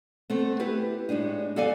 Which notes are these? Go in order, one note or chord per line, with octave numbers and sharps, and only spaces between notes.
A3 B3 C4
E4 G4 B4
A2 G#3 D4 D#4
E2 A4 D5 F5 G#5